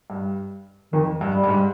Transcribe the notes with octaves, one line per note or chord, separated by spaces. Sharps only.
G2
F2 D#3
G2
G3
G2
G#2